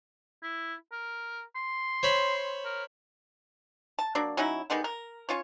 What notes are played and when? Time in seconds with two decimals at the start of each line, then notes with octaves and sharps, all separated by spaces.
0.43 E4
0.92 A#4
1.56 C6
2.03 C5 C#5 B5
2.65 A#4
3.99 A5
4.15 F#3 A#3 D4
4.37 F#3 C#4 D#4 E4
4.70 D#3 G3 G#3 B3
4.84 A#4
5.29 C#4 F4 C#5